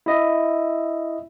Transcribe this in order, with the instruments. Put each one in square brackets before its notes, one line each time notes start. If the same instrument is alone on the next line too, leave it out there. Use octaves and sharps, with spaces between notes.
[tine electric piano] E4 D#5 E5